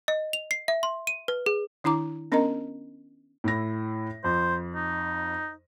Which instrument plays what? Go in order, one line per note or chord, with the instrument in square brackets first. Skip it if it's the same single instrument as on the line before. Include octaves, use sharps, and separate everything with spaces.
[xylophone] D#5
F7
C7
E5
C6
D#7
B4
G#4
[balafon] D#3 D4 E4 A#5 D6
B3 C#4 D4 A#4 D#5 A#5
[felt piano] A2 E4 A#6
[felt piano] F2 [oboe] C5
[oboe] D#4